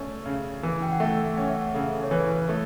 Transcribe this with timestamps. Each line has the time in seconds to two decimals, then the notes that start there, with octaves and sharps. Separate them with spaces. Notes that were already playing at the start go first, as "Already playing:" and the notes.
Already playing: A3 C#4 D5
0.26 C#3
0.63 E3
0.82 G5
0.92 F#5
1.00 A3 E5
1.37 C#4 F#5
1.50 E5
1.61 F#5
1.74 C#3 A4
2.03 C#5
2.11 E3 B4
2.48 A3 A4